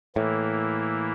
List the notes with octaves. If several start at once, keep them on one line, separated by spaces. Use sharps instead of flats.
A2 E3 A#3 E4